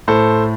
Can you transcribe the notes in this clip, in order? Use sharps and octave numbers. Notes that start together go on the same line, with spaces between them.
A2 A4 C5